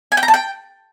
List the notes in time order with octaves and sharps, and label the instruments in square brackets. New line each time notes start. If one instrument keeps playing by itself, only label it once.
[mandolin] G#5
G5
A#5
A5
G5